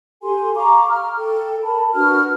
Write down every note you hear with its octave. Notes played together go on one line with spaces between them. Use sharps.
G4 A4 G#5 C6
F5 A#5 C#6 D6
F6
A4 G5
A#4 A5 B5
D4 F#4 B4 F6